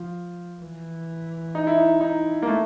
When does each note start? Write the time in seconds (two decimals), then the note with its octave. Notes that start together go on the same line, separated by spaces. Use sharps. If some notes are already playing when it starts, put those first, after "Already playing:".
Already playing: F3
0.62 E3
1.55 D#4
1.67 E4
1.78 D#4
2.01 D#4
2.42 A#3
2.47 A3